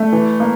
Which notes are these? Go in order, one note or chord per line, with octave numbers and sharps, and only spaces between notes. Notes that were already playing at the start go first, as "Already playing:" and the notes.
Already playing: A3
E3
A#3